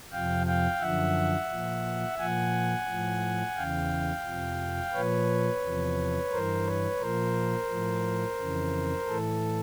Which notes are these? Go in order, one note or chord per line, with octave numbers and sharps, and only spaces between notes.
F2 C3 F3 F5 G5
F5 G5
F#2 D3 F3 E5 F#5
A#2 F3
A#2 F3 F#5 G#5
A2 F3
E2 C#3 E3 F5 G5
F2 C3 F3
A#2 F3 B4 C#5
E2 C3 F3
G2 E3 A#4 C5
B4 C#5
A#2 F3 A#4 C5
A2 F3
F2 C#3 E3
A2 E3 A4